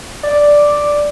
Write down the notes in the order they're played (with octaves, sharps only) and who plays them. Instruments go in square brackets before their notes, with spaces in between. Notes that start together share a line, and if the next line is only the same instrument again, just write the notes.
[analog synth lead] D5